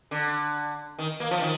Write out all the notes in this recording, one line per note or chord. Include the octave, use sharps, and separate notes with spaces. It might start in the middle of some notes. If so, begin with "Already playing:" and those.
D3
D#3
A#3
F3
D#3